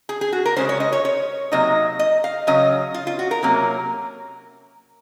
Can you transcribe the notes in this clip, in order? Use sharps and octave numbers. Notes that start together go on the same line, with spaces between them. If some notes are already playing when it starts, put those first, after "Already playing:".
G#4
G#4
F#4
A#4
C#3 G#3 C#4 C5
C#5
D#5
C#5
C#5
C3 F#3 A#3 D#4 D#5
D#5
F5
C#3 F#3 C#4 D#5
F4
F4
F#4
A#4
C3 F#3 A#3 C#4